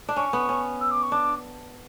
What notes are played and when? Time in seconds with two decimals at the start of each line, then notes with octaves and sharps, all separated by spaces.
0.09 D4
0.16 C#4 C#6
0.33 B3
0.49 C#4
0.81 E6
0.91 D6
1.03 C#6
1.12 D4 D6